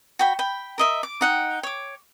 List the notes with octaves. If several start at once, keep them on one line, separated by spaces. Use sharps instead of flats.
F#4 G5 B5
G5 B5
A#4 D#5 E5
D6
D#4 F#5 G5
C#5 D6